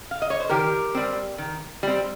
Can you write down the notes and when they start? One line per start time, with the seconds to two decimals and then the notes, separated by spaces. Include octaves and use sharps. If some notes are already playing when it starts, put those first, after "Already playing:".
0.11 F5
0.22 D#5
0.30 C#5
0.40 C5
0.49 D#3 G4 A#4
0.95 G3 C4
1.38 D#3
1.83 G3 C4